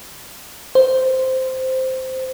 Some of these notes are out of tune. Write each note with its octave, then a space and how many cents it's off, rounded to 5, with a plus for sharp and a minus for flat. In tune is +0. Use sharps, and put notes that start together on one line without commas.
C5 -5